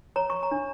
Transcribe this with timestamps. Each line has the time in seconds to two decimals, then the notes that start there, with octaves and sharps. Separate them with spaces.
0.16 C#5 A#5
0.30 C#6
0.43 A#5
0.51 D4